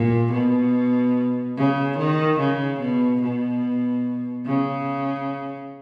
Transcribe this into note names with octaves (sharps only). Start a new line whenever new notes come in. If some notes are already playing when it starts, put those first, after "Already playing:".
Already playing: A#2
B2
C#3
D#3
C#3
B2
B2
C#3